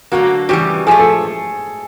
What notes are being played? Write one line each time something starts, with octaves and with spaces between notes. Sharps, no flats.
D3 F#3 A#3 F#4
C#3 E3 G3 G4
A#2 F3 A3 G#4
A4